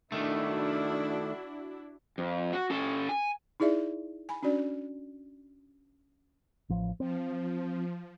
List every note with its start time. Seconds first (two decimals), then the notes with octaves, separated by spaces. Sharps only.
0.12 D#3 A3 D4 E4 F#4
2.18 F2
2.53 F#4
2.70 C#4 A4
3.09 G#5
3.60 D#4 E4 G#4 D5 E5
4.29 G#5 B5
4.43 C#4 D4 F#4 D5
6.69 A1 F3
7.00 F3 C4